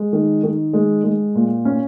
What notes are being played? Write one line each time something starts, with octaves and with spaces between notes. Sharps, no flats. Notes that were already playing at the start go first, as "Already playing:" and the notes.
Already playing: G#3
D#3
D#3
G#3
G#3
A#2
C#4